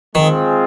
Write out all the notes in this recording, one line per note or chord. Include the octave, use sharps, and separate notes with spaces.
D#3 G#3 C4 F4 G#4 C5